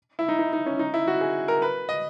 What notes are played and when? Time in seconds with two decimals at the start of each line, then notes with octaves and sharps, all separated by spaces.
0.19 E4
0.29 D#4
0.39 D#4
0.53 D#4
0.66 C#4
0.79 D#4
0.94 E4
1.07 F#4
1.21 G#4
1.48 A#4
1.62 B4
1.89 D#5